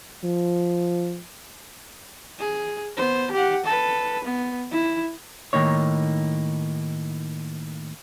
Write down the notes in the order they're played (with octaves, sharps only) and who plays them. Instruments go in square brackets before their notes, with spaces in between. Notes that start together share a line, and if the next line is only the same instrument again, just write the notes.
[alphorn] F3
[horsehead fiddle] G#4
B3 C5
G4 F#5
A4 B4
B3
E4
[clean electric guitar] A2 D#3 E3 A#3 D#4 C#5